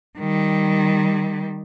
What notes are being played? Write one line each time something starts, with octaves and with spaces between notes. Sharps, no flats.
D#3 G3